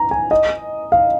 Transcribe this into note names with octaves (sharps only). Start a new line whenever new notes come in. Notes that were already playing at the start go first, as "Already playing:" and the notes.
Already playing: A#5
G#5
D#5
F5